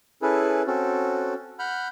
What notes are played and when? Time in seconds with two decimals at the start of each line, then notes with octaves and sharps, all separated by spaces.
0.22 C#4 E4 G#4 A4 B4
0.67 C4 C#4 F#4 A4
1.59 F#5 B5 F6 G6